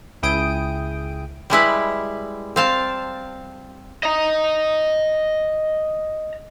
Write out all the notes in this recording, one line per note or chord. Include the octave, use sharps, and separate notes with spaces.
C#2 E4 G#4 G5 D#6 D7
G3 G#3 E4 B4
C4 F5 A5
D#5 A#5